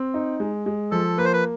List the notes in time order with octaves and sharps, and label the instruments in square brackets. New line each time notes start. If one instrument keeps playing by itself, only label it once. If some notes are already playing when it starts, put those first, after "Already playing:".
Already playing: [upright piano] C4
D#4
G#3
G#3
[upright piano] F3 [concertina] A4
[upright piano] A#3 [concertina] B4
[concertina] C5
B4